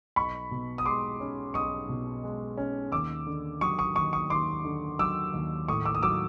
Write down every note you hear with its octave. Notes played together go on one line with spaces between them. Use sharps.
B1 B5 C#6
B2
D#6
G#3 C6 D6
C#4
B1 C#6 D#6
B2
G#3
C#4
D#2 D6 E6
D3
F#3 C#6 D#6
C#6 D#6
D#2 C#6 D#6
C#6 D#6
D#2 C6 D6
D3
F#3 D6 E6
D#2
A2 C#6 D#6
D6 E6
D#6
F#3 D6 E6